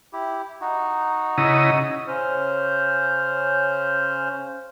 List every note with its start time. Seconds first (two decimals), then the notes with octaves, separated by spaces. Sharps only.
0.13 E4 G4
0.61 D#4 F#4
1.38 C#3 E4 D#5
2.08 C#3 C#4 C5 F6 G6